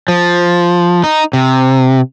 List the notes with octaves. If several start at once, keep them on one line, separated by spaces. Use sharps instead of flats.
F3
D#4
C3